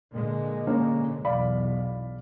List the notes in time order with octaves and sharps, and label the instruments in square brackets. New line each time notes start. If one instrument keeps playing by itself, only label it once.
[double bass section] A#2 D3 G#3
[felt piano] A#3 C#4
[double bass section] B1 E2 [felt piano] D5 F5 B5